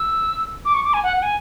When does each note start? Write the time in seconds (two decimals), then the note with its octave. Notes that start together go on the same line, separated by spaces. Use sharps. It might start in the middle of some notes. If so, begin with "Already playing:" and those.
Already playing: E6
0.65 D6
0.74 C#6
0.84 D6
0.94 G#5
1.03 F#5
1.17 F#5
1.22 G#5